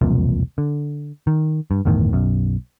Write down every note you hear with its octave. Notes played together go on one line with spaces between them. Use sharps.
E1 C2 F2 A#2
D3
D#3
G2
G1 E2 A2 D#3
B1 F#2